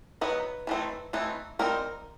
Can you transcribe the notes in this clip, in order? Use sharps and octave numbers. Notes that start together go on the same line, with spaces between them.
F#3 B3 D#4 B4
E3 A3 C4 D#4
E3 A3 C4 D#4
G3 C4 D#4 A#4